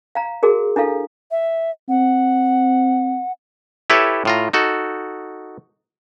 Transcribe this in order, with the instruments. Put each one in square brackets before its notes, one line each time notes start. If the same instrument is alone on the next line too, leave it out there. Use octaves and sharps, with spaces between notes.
[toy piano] F5 A#5
F#4 G#4 A#4
D4 E4 A4 F5
[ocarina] E5
[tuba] C4 [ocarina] F#5
[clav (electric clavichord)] E4 G4 A4 B4 C#5 E5
A2 F4 A#5
D#4 F#4 A4